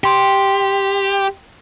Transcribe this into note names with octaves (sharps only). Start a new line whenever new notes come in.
G4 G5 C6